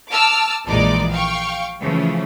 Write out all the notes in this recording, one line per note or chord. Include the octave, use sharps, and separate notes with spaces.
A5 D6 E6 F6
A#1 E3 G#3 D#4 D5 D6
F5 G5 C#6
C#3 E3 F3 A3